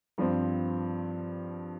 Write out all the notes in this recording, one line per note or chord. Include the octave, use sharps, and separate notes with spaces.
G2 F3 C4